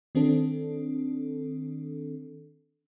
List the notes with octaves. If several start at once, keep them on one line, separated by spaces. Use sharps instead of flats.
D#3 C4 D4 A4